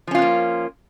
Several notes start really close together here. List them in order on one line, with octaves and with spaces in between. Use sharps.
F3 C#4 F4 B3 A#3